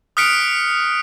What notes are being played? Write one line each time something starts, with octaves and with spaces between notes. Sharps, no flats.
D#6 F6 F#6 B6 C#7 D7